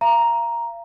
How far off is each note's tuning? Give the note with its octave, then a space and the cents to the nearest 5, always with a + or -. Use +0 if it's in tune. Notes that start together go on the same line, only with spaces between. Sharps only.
F5 -40 A#5 +5